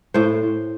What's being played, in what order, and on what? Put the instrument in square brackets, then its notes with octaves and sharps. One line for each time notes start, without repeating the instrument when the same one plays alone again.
[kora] A2 C5